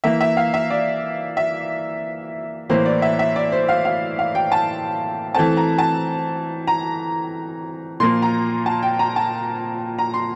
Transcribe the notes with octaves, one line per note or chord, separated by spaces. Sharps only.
E3 A#3 E5
E5
F5
E5
D5
E5
A2 E3 A#3 C5
D5
E5
E5
D5
C5
F5
F5
F5
G5
A5
E3 A3 C4 A5
A#5
A5
A#5
A#2 F3 A#3 C6
A#5
A5
G5
A#5
A5
A#5
C6